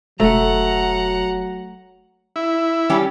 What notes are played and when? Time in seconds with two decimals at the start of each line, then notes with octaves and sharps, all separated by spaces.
0.20 E1 F#3 A3 F#5 A#5
2.36 E4
2.90 G3 C#4 G4